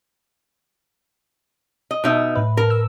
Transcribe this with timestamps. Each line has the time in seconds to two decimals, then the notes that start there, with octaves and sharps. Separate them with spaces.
1.91 D#5
2.04 B2 D#4 E5
2.35 A2 B4
2.57 A#4
2.70 E6